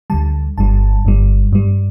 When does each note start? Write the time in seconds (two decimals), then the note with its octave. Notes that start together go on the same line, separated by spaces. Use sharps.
0.10 D2 D3 G3 A5
0.58 G1 G2 G3 A5
1.05 G1 G2 G3
1.52 G2 G3